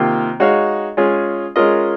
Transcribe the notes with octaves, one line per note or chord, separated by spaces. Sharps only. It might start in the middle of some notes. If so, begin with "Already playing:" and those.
Already playing: C3 D#3 A#3 F4
G#3 D#4 F#4 C#5 F5
G#3 C#4 F4 G#4
G#3 C#4 F4 A#4 D#5